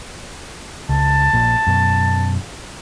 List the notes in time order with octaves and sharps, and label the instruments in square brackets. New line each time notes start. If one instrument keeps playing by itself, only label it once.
[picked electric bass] C#2 [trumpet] A5
[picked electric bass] A#1 A#2
F#2 B2